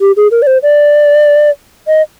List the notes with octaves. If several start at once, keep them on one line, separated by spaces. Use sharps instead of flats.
G4
G#4
A#4
D5
C5
D5
D#5